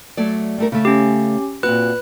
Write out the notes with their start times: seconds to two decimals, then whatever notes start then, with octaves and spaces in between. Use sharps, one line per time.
0.17 F#3 A3 D5
0.58 G3 A3 A#4
0.72 C#3 A3
0.85 C#4 G4
1.63 A#2 C4 F#4 B4 F#6